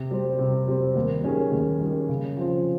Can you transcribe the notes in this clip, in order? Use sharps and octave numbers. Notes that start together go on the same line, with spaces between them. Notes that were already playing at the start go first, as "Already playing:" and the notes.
Already playing: C3
G3 C4
C3
G3 C4
D#2
D#3 G3 C#4 G#4
D#2
D#3 G3 C#4 G#4
C#3
F3 C4 F4